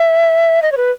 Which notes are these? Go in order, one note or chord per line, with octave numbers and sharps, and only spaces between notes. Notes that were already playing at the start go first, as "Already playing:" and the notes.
Already playing: E5
D#5
C#5
B4